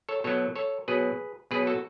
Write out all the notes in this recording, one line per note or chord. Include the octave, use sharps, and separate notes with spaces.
A4 C#5
B2 F#3 A4 C#5
A4 C#5
B2 F#3 G#4 B4
B2 F#3 G#4 B4
F#4 A4